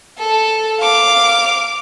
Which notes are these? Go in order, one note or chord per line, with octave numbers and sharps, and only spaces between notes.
A4
F5 D6